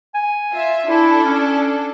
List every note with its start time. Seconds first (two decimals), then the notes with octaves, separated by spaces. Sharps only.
0.14 G#5
0.54 F4 E5
0.87 D4 E4 A4
1.24 C#4